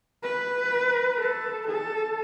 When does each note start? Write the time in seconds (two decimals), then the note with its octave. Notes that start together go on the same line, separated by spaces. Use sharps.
0.23 B4
1.19 A4
1.68 A4